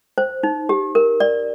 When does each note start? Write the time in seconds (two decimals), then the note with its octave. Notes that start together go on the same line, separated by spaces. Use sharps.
0.18 C5
0.43 D#4
0.69 G4
0.95 A#4
1.20 D5